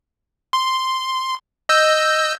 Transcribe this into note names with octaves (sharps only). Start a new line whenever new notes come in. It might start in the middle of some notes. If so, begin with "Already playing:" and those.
C6
D#5 E6 G6